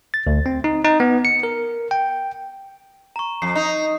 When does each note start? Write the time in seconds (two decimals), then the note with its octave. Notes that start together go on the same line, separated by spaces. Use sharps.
0.14 A6
0.27 D2
0.46 C4
0.64 D#4
0.85 D#4
1.00 B3
1.25 C#7
1.43 A#4
1.91 G5
3.16 A#5 C#6
3.42 F2 C7
3.56 D#4